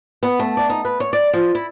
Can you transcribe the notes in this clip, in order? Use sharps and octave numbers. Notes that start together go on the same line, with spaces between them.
B3
A3
D5
D#4
B4
C#5
D5
F3
E4